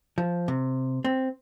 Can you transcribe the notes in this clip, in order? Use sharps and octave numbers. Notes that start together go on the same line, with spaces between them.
F3
C3
C4